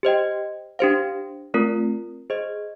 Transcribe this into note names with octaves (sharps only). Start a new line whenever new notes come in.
G4 C5 D#5 G5
D4 G4 C5 F5
A3 C4 F4 A#4
G#4 C5 D#5